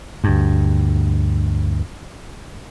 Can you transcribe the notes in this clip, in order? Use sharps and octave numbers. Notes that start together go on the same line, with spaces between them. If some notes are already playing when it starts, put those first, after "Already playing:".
D2 G2